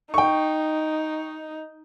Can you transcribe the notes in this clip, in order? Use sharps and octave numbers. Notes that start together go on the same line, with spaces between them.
D#4 G5 C#6